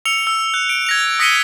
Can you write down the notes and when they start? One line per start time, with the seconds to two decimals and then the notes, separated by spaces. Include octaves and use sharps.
0.06 E6 C#7 F7
0.27 E6
0.54 F#6
0.69 D7
0.87 G#6 A#6 F7
1.19 D#6 A#6 B6 C#7 D#7 G7